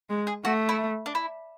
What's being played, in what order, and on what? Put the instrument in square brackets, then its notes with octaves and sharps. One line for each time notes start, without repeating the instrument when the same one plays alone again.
[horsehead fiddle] G#3
[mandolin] G#4
[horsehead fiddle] A3 [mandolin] F#4
[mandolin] E4
D4
E4